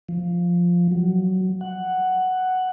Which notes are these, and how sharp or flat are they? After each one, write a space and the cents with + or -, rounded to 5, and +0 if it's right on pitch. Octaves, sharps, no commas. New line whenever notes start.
F3 +0
F#3 +15
F#5 +5